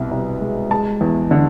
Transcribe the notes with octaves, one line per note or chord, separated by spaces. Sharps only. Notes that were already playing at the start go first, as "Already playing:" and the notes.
Already playing: C2 B2
C2
G#3
G#3 A5
E2
D3